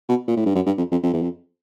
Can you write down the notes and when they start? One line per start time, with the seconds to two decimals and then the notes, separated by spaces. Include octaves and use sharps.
0.09 B2
0.28 A#2
0.37 A2
0.46 G2
0.55 F#2
0.66 G2
0.78 F2
0.92 F2
1.03 F2
1.13 E2
1.22 F2